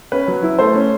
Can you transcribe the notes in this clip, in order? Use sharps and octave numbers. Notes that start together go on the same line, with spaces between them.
C#4 B4
F#3
E4
A3 C5
C#4